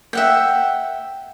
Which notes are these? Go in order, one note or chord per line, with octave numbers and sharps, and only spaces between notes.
E5 F#5 G5